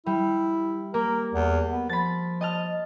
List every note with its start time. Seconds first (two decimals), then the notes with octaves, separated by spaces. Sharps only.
0.06 G3 E4
0.94 A#3 A#4
1.34 E2
1.71 B3
1.89 F3 B5 A6
2.41 D#5 A5 F6